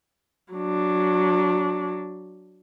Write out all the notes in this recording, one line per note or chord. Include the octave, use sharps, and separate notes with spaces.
F#3 D4